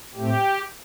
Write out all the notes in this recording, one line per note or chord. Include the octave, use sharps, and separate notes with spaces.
A2 A3 C4 G4